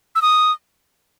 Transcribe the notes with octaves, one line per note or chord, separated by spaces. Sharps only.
E6
D#6